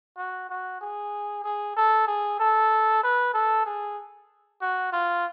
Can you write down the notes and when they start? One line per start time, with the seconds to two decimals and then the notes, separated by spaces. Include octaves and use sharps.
0.17 F#4
0.49 F#4
0.81 G#4
1.44 G#4
1.76 A4
2.07 G#4
2.40 A4
3.03 B4
3.34 A4
3.66 G#4
4.62 F#4
4.93 F4